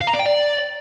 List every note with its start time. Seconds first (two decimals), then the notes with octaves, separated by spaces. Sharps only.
0.01 F5
0.07 A#5
0.14 D5
0.20 G5
0.26 D5